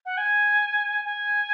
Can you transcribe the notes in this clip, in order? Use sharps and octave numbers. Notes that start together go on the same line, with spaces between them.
F#5
G#5
G#5